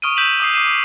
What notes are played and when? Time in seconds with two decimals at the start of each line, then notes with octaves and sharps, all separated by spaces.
0.02 C#6 D#6 F6 D7 D#7
0.17 E6 G6 B6 D#7 E7 F#7
0.40 D6 D#6 C7
0.54 D6 D#6 C7 D#7 E7
0.66 D6